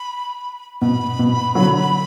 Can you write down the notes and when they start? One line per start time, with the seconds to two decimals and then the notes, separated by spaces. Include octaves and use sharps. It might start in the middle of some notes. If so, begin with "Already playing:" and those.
Already playing: B5
0.81 B2 B5
1.19 B2
1.55 D3 F#3